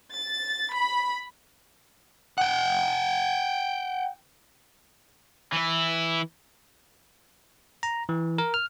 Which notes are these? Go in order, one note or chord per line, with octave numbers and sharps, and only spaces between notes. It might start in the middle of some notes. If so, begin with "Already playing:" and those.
A6
B5
F#5 G5
E3 E4
A#5
E3
A#4
F6